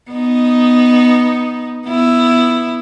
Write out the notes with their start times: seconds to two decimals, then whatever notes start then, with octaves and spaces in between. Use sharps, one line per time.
0.11 B3 D#4
1.86 B3 E4